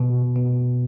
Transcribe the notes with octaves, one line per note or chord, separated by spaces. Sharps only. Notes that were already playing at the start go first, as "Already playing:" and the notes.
Already playing: B2
B2